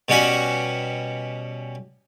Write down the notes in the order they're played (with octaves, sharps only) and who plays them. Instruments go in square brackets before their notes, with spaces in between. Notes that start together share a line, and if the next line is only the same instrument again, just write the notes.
[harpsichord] B2 G3 C#4 F#4 G#5